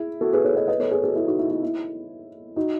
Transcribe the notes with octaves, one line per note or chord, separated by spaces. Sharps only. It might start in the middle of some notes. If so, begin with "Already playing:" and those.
Already playing: E4 G#4
F#4 A4
G#4 B4
A4 C#5
B4 D#5
B4 D#5
A4 C#5
G#4 B4
F#4 A4
E4 G#4
D#4 F#4
E4
E4
E4
D#4 F#4